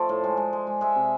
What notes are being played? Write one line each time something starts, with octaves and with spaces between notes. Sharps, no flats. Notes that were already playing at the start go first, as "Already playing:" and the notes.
Already playing: F3 A3 C5 D5
A2
G#3
G#3
G#3
G#3
G#3 E5
C3